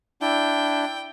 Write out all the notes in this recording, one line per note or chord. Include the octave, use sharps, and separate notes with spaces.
D4 E4 G5